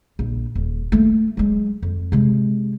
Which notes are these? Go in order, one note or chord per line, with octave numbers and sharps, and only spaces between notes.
A#1
D#1
A3 A#3
F#3 G#3
F2
C3 G#3